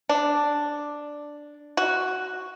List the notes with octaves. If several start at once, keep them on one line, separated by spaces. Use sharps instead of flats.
D4
F#4